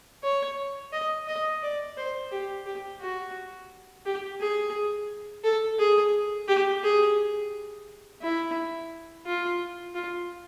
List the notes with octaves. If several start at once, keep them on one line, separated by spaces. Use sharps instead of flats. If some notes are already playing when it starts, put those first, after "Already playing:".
C#5
D#5
D#5
D5
C5
G4
G4
F#4
G4
G#4
A4
G#4
G4
G#4
E4
F4
F4